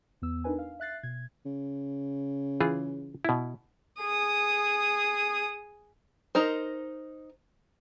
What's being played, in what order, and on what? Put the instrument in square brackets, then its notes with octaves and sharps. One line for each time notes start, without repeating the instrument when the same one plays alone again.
[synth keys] E2 B3 E6
D4 D#4 A#4 B4 G#5
F5
E5 F#6 A6 C7
B2 G#6
[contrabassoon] C#3
[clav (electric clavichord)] E3 F4 G#4
B2 E4
[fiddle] G#4 D#6
[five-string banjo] D#4 A#4 C5